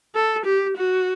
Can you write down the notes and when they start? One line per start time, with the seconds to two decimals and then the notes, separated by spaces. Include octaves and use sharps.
0.15 A4
0.45 G4
0.77 F#4